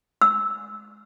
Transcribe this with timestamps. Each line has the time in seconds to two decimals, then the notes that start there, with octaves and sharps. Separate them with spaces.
0.22 E6